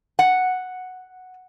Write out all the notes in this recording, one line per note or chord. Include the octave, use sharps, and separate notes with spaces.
F#5